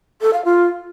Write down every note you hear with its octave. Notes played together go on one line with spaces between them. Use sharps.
A4
F5
F4